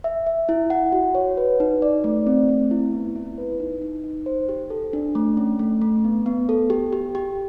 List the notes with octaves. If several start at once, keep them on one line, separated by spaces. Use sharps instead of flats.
E5
E5
E4
F#5
F#4
C#5
B4
D#4
D5
A3
C4
A3
E4
B3
E4
B4
D#4
D#4
D#4
C5
G4
A4
D4
A3
C#4
A3
A3
B3
B3
A4
G4
G4
G4